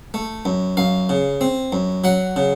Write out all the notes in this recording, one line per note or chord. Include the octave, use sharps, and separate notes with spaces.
A3
F#2
F#2 F5
C#3
C4
F#2
F#3 F#5
C#3